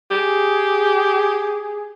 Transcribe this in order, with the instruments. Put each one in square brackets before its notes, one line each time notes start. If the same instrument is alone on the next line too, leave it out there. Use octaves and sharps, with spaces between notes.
[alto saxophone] G4 [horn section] G#4